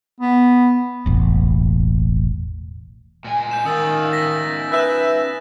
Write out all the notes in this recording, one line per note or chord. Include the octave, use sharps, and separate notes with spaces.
B3
E1 A1
A#2 G#3 G#5
G6 E7
D#3 C#4 D#4 F4 D#6 E6 A6
A#6 B6
B4 E5 F#6 G6 E7